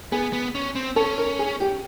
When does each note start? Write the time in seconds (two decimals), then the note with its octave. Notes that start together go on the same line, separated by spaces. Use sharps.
0.12 B3 G#4
0.33 B3
0.55 C#4
0.75 C4
0.96 C#4 A4
1.18 A#4
1.39 G#4
1.60 G4